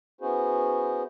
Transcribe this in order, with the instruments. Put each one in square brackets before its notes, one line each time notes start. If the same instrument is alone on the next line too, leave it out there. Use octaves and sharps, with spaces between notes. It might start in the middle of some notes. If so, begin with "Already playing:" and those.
[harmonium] B3 C#4 E4 F#4 G#4 C5